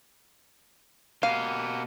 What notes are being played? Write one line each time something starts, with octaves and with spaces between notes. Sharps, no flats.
B2 A#3 G4 F5 F#5